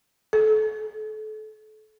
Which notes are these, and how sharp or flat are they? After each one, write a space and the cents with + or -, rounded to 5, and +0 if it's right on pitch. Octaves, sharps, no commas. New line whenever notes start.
A4 -30